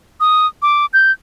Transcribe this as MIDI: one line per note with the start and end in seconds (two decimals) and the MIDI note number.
0.20 0.47 87
0.62 0.86 86
0.93 1.12 91